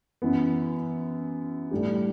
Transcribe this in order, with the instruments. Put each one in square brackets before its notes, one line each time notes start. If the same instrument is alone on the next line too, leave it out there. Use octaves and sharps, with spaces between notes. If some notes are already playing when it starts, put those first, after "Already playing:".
[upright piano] F#2 E3 B3
A2 G3 D4 G4